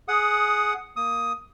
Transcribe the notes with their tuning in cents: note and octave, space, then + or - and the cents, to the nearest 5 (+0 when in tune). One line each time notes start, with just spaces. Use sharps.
G#4 +15 F#5 +0 D#6 +0
A#3 +0 D#6 +10